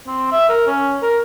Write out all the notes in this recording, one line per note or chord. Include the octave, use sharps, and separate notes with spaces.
C4
E5
A#4
C#4
A#4